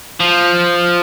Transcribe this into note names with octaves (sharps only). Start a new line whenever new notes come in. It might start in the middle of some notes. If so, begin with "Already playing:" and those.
F3